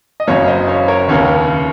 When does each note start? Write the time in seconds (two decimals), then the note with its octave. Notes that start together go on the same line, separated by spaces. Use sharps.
0.20 D#5
0.27 F#1 F#2 C#3 C#5 F5
0.47 C5 D#5
0.67 C#5 F5
0.88 A#4 C#5
1.08 F1 D#2 C#3 C#5 F5